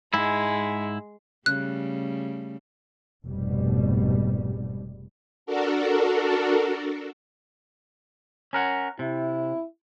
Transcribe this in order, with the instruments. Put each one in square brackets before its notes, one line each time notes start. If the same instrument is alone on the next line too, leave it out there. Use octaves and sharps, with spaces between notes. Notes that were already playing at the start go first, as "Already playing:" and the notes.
[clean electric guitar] G#2 E4 [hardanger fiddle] G#3
[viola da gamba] C#3 G3 A3 [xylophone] F#6
[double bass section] F1 G#2 B2 G3
[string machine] D4 F#4 A4 A#4
[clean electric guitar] C#4 A#4 F#5
[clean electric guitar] C3 [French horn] E4